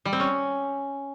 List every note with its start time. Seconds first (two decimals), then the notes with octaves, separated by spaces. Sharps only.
0.05 G3
0.13 C4
0.20 C#4